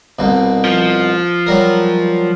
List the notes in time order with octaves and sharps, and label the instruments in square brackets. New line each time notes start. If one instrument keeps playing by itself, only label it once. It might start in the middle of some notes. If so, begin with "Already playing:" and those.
[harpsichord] C2 B2
[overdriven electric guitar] F3
[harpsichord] F#3 G3 A#4